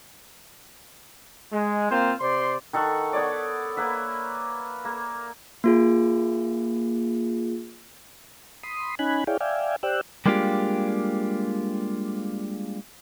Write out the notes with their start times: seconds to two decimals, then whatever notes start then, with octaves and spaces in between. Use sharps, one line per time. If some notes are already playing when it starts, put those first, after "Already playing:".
1.51 G#3
1.90 A#3 C4 F4 C5
2.20 C3 C5 D5 C6
2.73 D#3 A4 F#5 C#6
3.13 B3 C#5 D5
3.77 A#3 B4 E5
4.85 A#3
5.64 A#3 F4 G#4
8.63 B5 C6 D#6
8.99 C#4 D#4 G#5 B5 F#6
9.27 E4 G#4 C#5 D5 F5 G5
9.41 D5 E5 F5 G5 G#5
9.83 G4 C5 D5 G5 E6 F#6
10.26 G3 G#3 A#3 D4 F4 G4